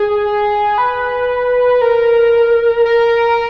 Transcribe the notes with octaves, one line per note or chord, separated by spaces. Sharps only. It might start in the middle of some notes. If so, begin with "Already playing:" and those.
Already playing: G#4
B4
A#4
A#4